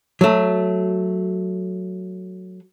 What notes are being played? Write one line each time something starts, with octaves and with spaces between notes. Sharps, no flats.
F#3 A3